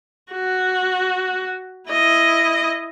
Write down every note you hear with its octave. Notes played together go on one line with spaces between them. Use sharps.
F#4
E4 D#5